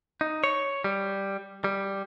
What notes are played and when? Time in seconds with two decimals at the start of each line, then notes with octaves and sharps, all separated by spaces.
0.21 D#4
0.44 C#5
0.84 G3
1.64 G3